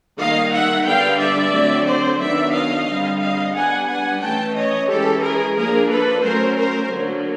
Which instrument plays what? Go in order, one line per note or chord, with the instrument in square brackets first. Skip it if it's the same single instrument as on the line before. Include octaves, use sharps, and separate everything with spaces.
[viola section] D#3 G3 A#3 D#5 F5
E5 F#5
D3 G3 B3 D4 F5 G5
D5 E5
D3 F#3 A3 C4
C5 D5
D#3 F#3 B3 D4 D5 E5
D#5 F5
D3 G3 C4
D#5 F5
G3 B3 D4 F#5 G#5
F#5 G#5
E3 A3 C#4 G5 A5
C#5 D#5
E3 G#3 C#4 G4 A4
G#4 A#4
F3 A#3 D4 G#4 A#4
A4 B4
F#3 A3 C#4 A#4 C5
A#4 C5
D3 F#3 A#3